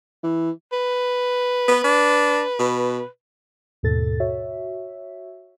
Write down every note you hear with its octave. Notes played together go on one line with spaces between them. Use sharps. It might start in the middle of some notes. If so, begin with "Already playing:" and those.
E3
B4
B3
D4
B2
D#2 G#2 B2 A4 A6
F#4 C#5 E5